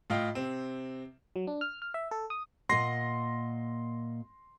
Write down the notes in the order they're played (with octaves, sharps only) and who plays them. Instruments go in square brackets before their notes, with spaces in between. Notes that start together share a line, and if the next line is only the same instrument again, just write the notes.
[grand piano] A2 F4 D#5 F5 G5
C3 C4
[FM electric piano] F#3
D4
F6
F6
E5
A4
D#6
[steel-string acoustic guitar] A#2 D#5 F#5 [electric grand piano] C6 A#6 C7